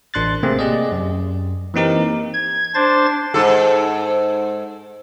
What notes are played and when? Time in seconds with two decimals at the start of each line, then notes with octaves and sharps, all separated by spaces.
0.14 A1 D4 C6 F#6 A6
0.43 C3 A3 A#3 C4 G#4
0.59 G4 G#4 D5 D#5
0.92 F#2
1.74 E3 A#3 C4 D#4 G4 A#4
2.33 G#6
2.74 D4 C5 A6
3.34 G#2 A4